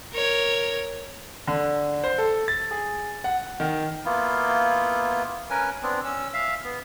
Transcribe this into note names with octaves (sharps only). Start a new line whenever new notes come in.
A#4 C#5
D3
C5
A4
A6
G#4
F#5
D#3
A#3 B3 E4 F4
C#4 A#4 B4 G#5
B3 C4 D4
C#4 E6
E5 F5
B3